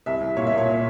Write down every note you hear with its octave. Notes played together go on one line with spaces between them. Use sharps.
C2 E5
C2
A#2 C#5
E5
A#2
C#5